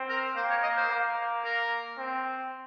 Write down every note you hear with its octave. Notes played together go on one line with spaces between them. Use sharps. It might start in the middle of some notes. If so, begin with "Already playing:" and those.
Already playing: C4
A#4
A#3 C5
C#5
D#5
C5
A#3
A#4
C4